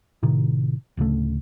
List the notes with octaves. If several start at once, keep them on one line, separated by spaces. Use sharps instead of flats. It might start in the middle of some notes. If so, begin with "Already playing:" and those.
A2 C3 D#3
D1 D2 C#3 A3